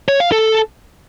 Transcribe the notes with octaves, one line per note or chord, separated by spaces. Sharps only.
C#5
F5
A4